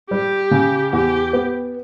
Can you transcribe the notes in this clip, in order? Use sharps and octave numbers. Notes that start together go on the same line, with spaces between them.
G3 G4
C#3
E2 G4
B3